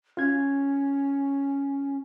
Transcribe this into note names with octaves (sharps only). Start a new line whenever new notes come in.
C#4 F4 G#6